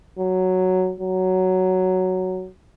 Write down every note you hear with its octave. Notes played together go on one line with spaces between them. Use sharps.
F#3
F#3